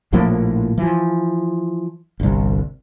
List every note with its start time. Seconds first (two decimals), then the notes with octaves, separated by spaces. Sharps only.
0.13 A#1 A2 F3 A#3
0.78 E3 F3
2.20 G1 C2